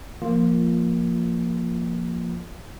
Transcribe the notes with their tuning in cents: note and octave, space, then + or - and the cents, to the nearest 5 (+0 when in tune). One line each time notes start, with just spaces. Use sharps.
F3 -10 A#3 +0 F4 +0